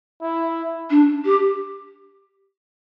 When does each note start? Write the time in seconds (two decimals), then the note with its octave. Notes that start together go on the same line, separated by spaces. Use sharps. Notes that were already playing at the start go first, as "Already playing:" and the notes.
0.22 E4
0.90 D4
1.25 G4